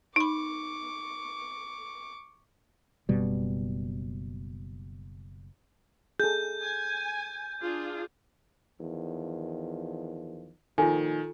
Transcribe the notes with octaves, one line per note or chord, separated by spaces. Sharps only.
D#4 B5 C#6 D6
F#1 B2 G3
G#4 A4 G6
G#5
D4 F4 G#4
E2 D#3 F3
A#2 D#3 F3 F4 A4 G#5